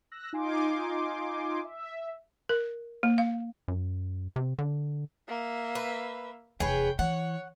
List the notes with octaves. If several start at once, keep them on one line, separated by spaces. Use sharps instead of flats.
E6 F#6 A#6
D#4 F4 G#5 C6 D6
E5
A#4
A#3
F5
F#2
C3
D3
A#3 E5
B4
F1 E2 G#4 B4 C#5 G5
E3 C#5 F#5